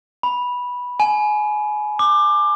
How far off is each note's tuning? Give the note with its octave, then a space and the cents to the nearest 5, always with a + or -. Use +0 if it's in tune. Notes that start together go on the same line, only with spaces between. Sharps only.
B5 -10
G#5 +25
D6 +20